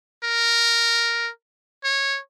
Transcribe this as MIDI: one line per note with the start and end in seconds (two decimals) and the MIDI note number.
0.24 1.30 70
1.84 2.19 73